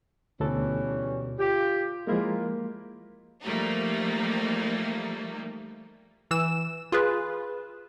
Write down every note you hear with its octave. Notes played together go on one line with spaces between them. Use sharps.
D2 B2 E3 G3 C#4 A4
F4 G4
F3 G#3 A#3 E4 F4 A#4
F3 G3 A3 A#3 D#4
E3 E6 E7
F4 G#4 B4